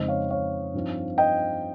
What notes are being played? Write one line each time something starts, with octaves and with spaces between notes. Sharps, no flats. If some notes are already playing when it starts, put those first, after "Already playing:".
Already playing: F2 C#3 G#3 C4 D#4 C5 D#5
C#5 F5
C#5 F5
G2 F3 C4 D#4
D#5 G5